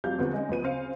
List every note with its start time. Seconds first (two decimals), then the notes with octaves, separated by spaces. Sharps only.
0.04 F1 F2 F#3 G3 F5 G6
0.19 E2 D3 F3 G3 B3 C4
0.33 G#3 C#4 D#4
0.49 D2 F3 B3 D#7
0.62 C#3 C4 C5 F5 C#7